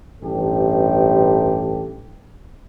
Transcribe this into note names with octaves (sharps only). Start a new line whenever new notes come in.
A1 G2 G4 A4